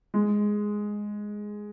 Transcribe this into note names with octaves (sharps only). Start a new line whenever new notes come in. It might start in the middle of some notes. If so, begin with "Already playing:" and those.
G#3